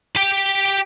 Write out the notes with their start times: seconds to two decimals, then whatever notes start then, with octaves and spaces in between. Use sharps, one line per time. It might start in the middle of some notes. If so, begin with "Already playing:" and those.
0.16 G4 G5